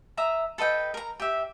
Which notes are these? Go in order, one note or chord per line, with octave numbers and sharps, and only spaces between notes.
E5 A#5 D#6
A4 B4 D#5 G5
A#4 A#5
G4 E5